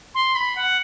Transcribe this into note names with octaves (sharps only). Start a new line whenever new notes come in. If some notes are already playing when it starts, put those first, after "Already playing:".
C6
B5
F#5